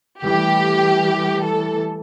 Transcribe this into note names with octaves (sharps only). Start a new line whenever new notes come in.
E3 G3 A3 G4
A4